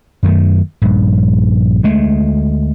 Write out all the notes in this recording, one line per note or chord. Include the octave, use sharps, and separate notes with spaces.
F#2 D#3 A3
A#1 G2
D2 G#3 A3